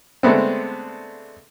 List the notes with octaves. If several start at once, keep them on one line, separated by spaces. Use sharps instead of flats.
D3 G#3 A3 B3 C4